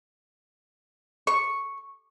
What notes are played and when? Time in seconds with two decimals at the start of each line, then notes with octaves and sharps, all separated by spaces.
1.27 C#6